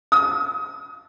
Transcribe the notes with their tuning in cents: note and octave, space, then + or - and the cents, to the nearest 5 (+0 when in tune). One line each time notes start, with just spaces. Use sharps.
D#6 +30